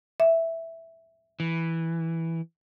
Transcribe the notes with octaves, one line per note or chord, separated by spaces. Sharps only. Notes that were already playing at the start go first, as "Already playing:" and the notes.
E5
E3